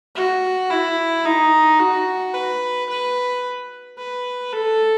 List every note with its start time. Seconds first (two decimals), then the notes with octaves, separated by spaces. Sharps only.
0.15 F#4
0.70 E4
1.25 D#4
1.79 F#4
2.34 B4
2.89 B4
3.98 B4
4.52 A4